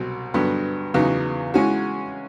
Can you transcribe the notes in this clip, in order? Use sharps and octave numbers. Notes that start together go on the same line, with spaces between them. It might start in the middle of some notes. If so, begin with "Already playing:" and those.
Already playing: C2 B2 F#3
G2 D3 F#3 B3
E2 C#3 F#3 B3 D#4
E3 G#3 C#4 F#4